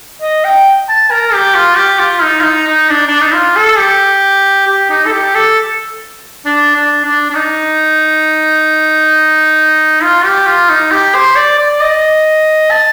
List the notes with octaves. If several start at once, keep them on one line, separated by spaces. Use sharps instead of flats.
D#5
G5
A5
A#4
G4
F4
G4
F4
D#4
F4
D#4
D#4
D4
D4
D#4
F4
A4
G4
G4
D#4
A4
G4
A4
D4
D4
D4
D4
D#4
F4
G4
F4
D#4
G4
C5
D5
D5
D#5
A5